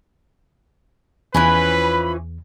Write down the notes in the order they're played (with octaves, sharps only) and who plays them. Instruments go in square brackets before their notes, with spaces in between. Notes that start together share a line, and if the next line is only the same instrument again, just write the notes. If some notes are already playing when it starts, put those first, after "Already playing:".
[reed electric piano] E2 [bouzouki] E3 F3 C#4 [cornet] B4 [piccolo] B5